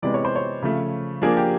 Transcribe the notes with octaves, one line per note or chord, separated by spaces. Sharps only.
C3 E3 G#3 B3 D5
C#5
C5
C#5
C#3 F3 A3
F3 A#3 D4 G#4
G4